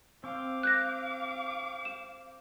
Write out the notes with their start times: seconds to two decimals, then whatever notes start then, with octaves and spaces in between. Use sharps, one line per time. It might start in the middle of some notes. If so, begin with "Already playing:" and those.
0.24 C4 F5 D6
0.63 F#6 G6 A#6
1.85 E7